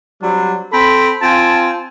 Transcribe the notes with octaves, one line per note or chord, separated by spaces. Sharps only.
F#3 G3 C4 D4
C4 A4 B5
C4 F4 G#5 A5